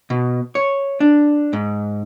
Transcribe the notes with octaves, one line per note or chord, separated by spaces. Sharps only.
B2
C#5
D4
G#2